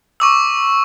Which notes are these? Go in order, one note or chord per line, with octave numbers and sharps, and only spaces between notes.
C#6 D6 E6